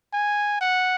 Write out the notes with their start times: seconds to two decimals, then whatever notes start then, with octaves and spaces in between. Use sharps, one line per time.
0.13 G#5
0.61 F#5